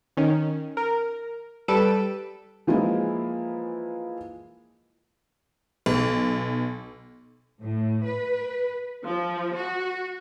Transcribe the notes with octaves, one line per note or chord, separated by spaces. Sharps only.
D#3 C#4
A#4
G3 A4 B4 D7 E7
E3 F3 G#3 A#3 E4
B1
A2
B4
F3
F#4